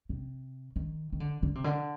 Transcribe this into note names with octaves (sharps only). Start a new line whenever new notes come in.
C3
D#3
D#3
D3
D3
C3
D3